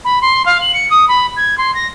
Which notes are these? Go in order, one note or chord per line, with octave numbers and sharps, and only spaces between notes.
B5
C6
F5
F#7
C#7
D#6
B5
G#6
C6
A#6